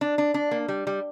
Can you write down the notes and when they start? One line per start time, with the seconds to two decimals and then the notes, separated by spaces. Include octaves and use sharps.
0.01 D4
0.18 D4
0.34 D4
0.51 A#3
0.68 G3
0.87 G3